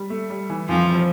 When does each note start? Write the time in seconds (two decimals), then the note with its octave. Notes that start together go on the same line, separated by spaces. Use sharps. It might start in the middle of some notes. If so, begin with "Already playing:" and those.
Already playing: G3
0.10 A3
0.30 G3
0.50 E3
0.69 F2 E3 F3
0.95 F3